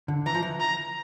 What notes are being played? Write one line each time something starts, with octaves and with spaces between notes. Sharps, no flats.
D3
E3 A#5
F3
E3
A#5